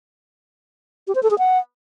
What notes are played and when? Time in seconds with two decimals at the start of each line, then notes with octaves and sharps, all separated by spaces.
1.07 G4
1.15 C5
1.23 A4
1.31 G#4
1.38 F#5